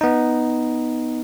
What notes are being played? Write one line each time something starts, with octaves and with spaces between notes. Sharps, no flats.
B3 D#4